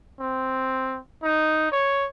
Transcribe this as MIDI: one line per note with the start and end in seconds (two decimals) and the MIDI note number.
0.20 0.98 60
1.23 1.70 63
1.72 2.07 73